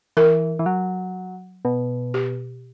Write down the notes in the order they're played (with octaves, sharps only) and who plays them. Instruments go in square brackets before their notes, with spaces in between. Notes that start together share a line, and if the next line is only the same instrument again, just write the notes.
[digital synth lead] E3 [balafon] A#4
[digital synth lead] E3
F#3
B2
[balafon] G4